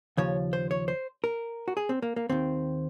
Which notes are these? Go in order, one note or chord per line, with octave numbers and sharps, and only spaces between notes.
D#2 C#3 F3 C#5
C5
C#5
C5
A#4
F#4
G#4
C4
A#3
A#3
D#2 D#3 C4